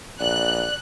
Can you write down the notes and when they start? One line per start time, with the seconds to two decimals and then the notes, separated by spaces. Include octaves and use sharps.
0.20 A#1 D5 F#6